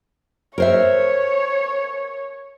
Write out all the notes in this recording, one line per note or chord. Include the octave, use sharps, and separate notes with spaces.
A#4 C5 C#5 E5